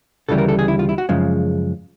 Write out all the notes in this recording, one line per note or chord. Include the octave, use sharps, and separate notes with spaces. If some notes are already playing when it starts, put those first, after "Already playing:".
D2 C#3 E3 G3 A4
A#4
A4
G#4
E4
F4
E4
F#4
F#2 C#3 F3 G#3